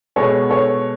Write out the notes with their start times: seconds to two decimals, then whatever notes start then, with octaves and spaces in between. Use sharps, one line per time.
0.16 B2 G#3 B3 A4 C#5
0.50 A4 C#5